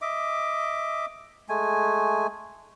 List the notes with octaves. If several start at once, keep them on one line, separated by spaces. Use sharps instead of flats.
D#5 E5 D6
G#3 A3 G#5